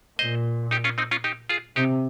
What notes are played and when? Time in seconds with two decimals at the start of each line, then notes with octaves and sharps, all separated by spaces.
0.19 A#2 C5 D#5
0.71 D#4 G4
0.84 C#4 F4
0.98 C4 D#4
1.11 C#4 F4
1.24 D#4 G4
1.49 F4 G#4
1.76 C3 D#4 G4